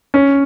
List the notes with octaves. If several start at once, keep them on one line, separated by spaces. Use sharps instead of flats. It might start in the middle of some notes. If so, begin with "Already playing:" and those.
C#4